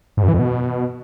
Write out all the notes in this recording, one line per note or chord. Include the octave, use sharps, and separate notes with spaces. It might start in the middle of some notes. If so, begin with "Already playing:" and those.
G#2
F#2
E3
F2
B2